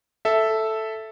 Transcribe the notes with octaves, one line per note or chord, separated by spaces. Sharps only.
A4 E5